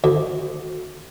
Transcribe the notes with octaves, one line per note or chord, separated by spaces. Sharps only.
D2